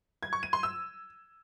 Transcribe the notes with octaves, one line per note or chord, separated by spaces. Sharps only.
G#6
C#6
D#7
C6
E6